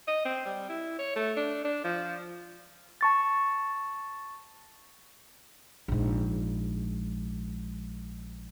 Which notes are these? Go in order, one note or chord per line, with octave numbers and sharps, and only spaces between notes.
D#5
C4
G3
E4
C#5
A3
D4
D4
F3
A5 C#6 A6
A#1 G#2